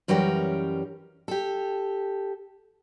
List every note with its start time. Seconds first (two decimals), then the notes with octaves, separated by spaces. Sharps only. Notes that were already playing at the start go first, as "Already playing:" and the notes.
0.08 F#2 E3 G3 C#4 A#4 G5
1.28 G4 A4